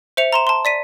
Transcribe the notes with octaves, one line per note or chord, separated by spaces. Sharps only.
C5 E5 C#7 F7
A#5 C6 E7
A5 C6
D5 B6 D#7